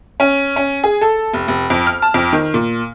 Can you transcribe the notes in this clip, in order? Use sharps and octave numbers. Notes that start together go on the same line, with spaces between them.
C#4
C#4
G#4
A4
F1
F1
F2
F6
A5
F2
D#3
A#2